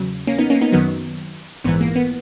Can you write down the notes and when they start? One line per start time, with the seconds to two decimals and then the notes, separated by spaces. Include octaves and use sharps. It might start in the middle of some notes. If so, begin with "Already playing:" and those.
Already playing: E2 C#3 F#3
0.27 A#3 C#4
0.38 B3 D#4
0.50 A#3 C#4
0.61 B3 D#4
0.72 F#2 D#3 F#3 B3
1.64 A#1 G#2 E3 B3
1.81 A#3
1.96 B3